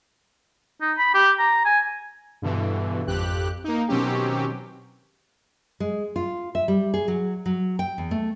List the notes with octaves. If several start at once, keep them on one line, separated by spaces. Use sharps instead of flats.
D#4
B5
G4
A#5
G#5
G2 B2 D3 E3
G#1 F2 G4 F#6
A#3 D#4
B2 D#3 F#3 C4 C#4 G4
G#3
F4
E5
G3
G#4
F#3
F#3
G5
E2
A3